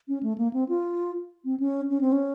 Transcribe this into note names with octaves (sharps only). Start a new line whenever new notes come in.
C#4
A3
A#3
C4
F4
C4
C#4
C#4
C4
C#4